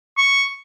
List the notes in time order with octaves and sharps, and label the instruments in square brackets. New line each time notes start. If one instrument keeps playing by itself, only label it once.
[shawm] C#6